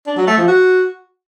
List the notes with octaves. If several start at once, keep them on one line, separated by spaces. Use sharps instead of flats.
D4
F#3
A3
F3
F#4